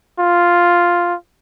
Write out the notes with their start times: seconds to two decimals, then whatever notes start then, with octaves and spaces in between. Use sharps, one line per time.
0.20 F4